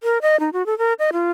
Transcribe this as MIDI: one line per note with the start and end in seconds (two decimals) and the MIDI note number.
0.03 0.18 70
0.22 0.39 75
0.40 0.50 63
0.53 0.65 66
0.66 0.77 69
0.78 0.93 70
0.99 1.11 75
1.13 1.31 65